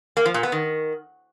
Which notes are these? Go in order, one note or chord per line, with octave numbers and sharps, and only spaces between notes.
A#3
F3
A#2
B3
D#3